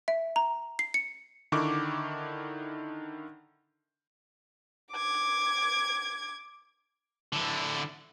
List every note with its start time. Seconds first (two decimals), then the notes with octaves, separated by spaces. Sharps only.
0.08 E5
0.36 A#5
0.79 C7
0.94 C#7
1.52 D3 D#3 E4 C#6 D6
4.93 D6 G#6
7.33 D3 E4